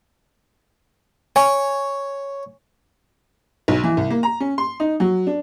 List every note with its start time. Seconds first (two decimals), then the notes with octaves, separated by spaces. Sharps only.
1.36 C#5 G#5
3.68 B1
3.84 E3
3.97 C2
4.10 A#3
4.23 A#5
4.40 C#4
4.58 C6
4.80 D#4
5.00 F#3
5.27 D4